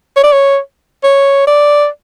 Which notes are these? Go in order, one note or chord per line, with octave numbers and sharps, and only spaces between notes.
C#5
D5
C#5
C#5
D5